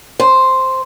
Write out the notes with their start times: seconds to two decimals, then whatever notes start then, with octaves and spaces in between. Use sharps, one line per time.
0.20 C5